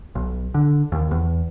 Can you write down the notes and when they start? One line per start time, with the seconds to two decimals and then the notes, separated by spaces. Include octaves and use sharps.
0.15 B1
0.54 D3
0.92 D#2
1.11 E2